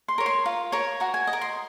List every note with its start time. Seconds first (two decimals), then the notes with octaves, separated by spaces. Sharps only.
0.08 C6
0.18 A#4 C#5
0.26 C6
0.46 F4
0.72 A#4 C#5
1.00 F#4 A#5
1.14 G#5
1.27 D#5
1.33 A#4
1.41 C6